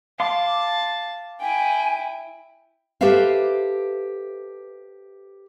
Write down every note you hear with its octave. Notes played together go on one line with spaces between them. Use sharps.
F5 A5 C6 D6
E4 G5 G#5
G4 A4 B4 C5 E5 F5